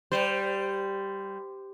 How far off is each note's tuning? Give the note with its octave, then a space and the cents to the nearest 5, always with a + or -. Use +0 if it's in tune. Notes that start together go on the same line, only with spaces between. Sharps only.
G3 +0 C5 -20